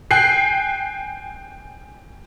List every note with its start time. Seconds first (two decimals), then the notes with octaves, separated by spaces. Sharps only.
0.11 G5 G#5 F#6 C7